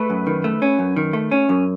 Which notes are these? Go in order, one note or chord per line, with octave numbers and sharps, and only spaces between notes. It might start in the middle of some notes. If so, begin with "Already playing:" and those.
Already playing: A3 B4
F#2
D#3
A3
C#4
F#2
D#3
A3
C#4
F#2